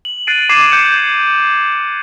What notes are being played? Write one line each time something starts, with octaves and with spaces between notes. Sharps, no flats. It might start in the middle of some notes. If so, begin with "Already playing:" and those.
F#7
F#6 A6 C7 D7 D#7
D6 G#6 C7 D#7 E7
G6 C#7 E7 F#7